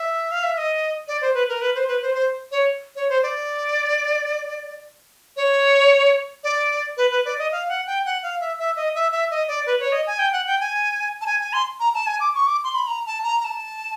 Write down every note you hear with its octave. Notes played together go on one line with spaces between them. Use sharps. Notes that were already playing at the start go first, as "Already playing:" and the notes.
Already playing: E5
F5
E5
E5
D#5
D5
C5
B4
A#4
B4
C5
B4
C5
C5
C#5
C#5
C5
D5
C#5
D5
B4
B4
D5
D#5
F5
F#5
G5
F#5
F5
E5
E5
D#5
E5
E5
D#5
D5
B4
C#5
D#5
G#5
G5
F#5
G5
G#5
A5
G#5
G#5
C6
A#5
A5
G#5
D6
C#6
D6
C6
B5
A#5
A5
A#5
A#5
A5